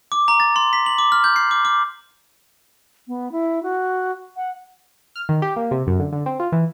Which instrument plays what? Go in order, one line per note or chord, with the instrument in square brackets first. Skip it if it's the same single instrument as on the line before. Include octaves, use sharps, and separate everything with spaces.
[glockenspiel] D6
A#5
A6
C6
B6
F#7
D6
F6
G6
C7
D6
D6
[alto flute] B3
E4
F#4
F#5
[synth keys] F6
D#3
G4
A#3
C3
F#2
D3
D3
C4
F4
E3